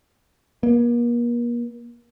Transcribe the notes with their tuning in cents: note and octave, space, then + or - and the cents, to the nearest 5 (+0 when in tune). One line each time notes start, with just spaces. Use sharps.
A#3 +40